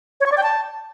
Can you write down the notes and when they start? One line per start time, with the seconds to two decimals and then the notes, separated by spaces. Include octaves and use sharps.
0.21 C#5
0.26 C#6
0.32 D5
0.37 G5
0.43 A5